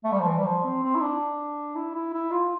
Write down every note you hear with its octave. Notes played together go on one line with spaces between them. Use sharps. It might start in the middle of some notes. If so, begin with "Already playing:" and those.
A3
G3
F3
E3
G3
F3
C4
C4
E4
D4
E4
E4
E4
F4